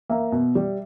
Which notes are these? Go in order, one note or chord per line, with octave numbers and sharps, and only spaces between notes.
A#3 E5
B2
G3